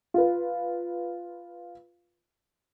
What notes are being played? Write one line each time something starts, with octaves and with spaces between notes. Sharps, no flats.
F4 B4